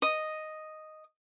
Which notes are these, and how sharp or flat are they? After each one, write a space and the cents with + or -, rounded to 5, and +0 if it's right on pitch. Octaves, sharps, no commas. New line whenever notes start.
D#5 +0 D#6 +0